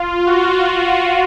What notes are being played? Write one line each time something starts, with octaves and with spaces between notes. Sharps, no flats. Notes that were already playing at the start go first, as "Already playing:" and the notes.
Already playing: F4
F#4